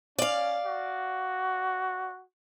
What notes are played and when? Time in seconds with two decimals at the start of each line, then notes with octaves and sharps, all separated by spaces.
0.18 C#4 D5 F5
0.66 F#4